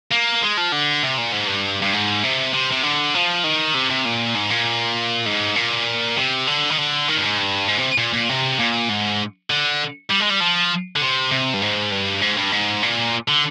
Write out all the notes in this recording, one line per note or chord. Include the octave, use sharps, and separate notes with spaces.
A#3
G#3
F3
D3
C3
A#2
G#2
G2
G2
G#2
C3
C3
C3
D3
F3
D#3
C3
C3
A#2
G#2
A#2
G#2
A#2
C3
D3
D#3
D3
D#3
G2
G#2
G2
G#2
C3
A#2
A#2
C3
A#2
G#2
D3
G3
G#3
G3
F3
D3
C3
C3
G2
G#2
G2
G#2
G2
G#2
A#2
D3